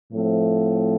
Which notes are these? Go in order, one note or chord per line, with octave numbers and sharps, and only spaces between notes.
A2 F3 A3 C4